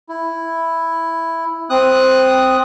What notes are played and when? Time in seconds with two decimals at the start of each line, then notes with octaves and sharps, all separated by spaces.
0.09 E4
1.70 C4 D#6 F#6